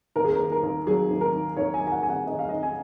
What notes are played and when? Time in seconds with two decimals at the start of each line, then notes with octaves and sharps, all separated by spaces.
0.16 D#2 A#4
0.25 G#4
0.32 A#4
0.39 D#2
0.52 A#4
0.63 D#2
0.86 F#3 G#4
1.10 D#2
1.21 A#4
1.33 D#3
1.57 D#2 C#5
1.74 G#5
1.80 D#3
1.87 G#5
1.92 F#5
2.03 D#2 G#5
2.09 F#5
2.27 D#2 D#5
2.39 F5
2.49 D#3 D#5
2.63 G#5